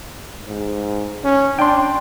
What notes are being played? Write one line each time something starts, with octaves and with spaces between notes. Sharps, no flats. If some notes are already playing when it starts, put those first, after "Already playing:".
G#2
C#4
D4 G5 C6